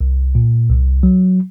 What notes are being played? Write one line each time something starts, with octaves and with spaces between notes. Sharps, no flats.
C2
A#2
C2
F#3